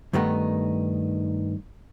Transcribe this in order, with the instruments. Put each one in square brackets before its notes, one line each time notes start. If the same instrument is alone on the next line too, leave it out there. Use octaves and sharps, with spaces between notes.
[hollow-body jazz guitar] G2 D#3 A3 B3 D#4